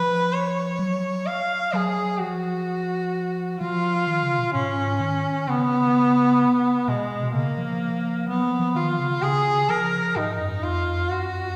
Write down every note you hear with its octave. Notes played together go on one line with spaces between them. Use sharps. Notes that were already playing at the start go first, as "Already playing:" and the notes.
Already playing: F3 B4
C#5
F#3
F5
F#3 G#4
F3 F#4
F3 F4
D#3
C#3
B2
G#2 C#4
D#3
C#3 B3
B2 G#3
B2
C#3 A#3
F3
F#3 B3
F3
F3
D#3 F4
C#3
C#3 G#4
F3 A#4
G#2 D#4
F#2
F2 F4
F#2 F#4